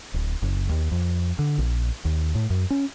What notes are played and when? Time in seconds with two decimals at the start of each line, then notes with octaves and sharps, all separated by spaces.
0.14 D1
0.42 F#1
0.69 D#2
0.91 F2
1.39 D3
1.58 A#1
2.05 D#2
2.35 A2
2.50 F#2
2.70 C#4